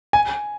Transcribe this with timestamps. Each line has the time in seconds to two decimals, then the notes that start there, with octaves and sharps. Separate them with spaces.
0.13 G#5